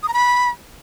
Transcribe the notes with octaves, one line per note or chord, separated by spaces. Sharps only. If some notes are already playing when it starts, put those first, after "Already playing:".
D#6
A#5
B5